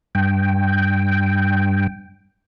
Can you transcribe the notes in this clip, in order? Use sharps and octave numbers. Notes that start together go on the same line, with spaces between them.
G2 G5